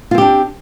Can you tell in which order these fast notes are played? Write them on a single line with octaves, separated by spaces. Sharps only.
F4 C4 G4 D4